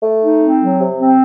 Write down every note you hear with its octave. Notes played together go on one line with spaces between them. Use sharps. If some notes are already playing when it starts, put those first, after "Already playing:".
A3
D#4
C4
F#3
C3
C4